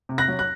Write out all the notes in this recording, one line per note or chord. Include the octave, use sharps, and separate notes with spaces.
C3
F#6 A#6
F#3
F#6